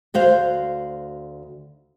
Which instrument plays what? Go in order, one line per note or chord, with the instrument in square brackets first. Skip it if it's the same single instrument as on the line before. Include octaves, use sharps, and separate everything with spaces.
[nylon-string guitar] D2 F#4 C5 F5